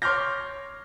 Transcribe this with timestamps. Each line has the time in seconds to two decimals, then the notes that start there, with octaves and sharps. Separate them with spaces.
0.02 C#5 C6 D6 F6 G6 A#6